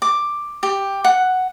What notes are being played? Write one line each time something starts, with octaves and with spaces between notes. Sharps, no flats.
D6
G4
F#5